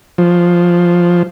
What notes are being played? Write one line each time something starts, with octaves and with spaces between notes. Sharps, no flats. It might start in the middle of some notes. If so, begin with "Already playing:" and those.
F3